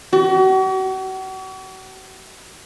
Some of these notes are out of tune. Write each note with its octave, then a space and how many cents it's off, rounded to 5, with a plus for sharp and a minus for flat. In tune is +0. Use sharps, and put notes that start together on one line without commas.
F#4 +40